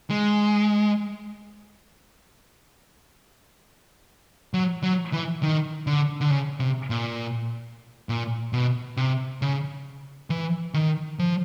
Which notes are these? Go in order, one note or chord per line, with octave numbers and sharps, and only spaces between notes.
G#3
F#3
F#3
E3
D#3
D3
D3
C#3
C3
A#2
A#2
B2
C3
C#3
E3
D#3
F3